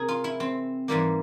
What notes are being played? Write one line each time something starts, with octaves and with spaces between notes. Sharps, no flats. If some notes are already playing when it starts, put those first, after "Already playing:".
Already playing: C3 G#4 A#4
F4
E4
C4
G#2 E3 G3 A#3